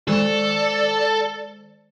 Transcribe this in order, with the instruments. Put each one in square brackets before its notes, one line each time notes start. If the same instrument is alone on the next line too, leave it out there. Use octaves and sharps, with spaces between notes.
[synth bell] D#3 G#3 C5 [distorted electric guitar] A4 [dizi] D5